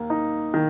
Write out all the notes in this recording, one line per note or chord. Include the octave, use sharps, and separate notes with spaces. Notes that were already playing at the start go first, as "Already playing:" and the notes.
Already playing: D#2 A#3
D#4
D#3